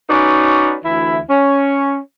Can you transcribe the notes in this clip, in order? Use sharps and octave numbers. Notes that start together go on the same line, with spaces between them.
C#4 D#4 F#4 B4 D5
D2 E3 E4
C#4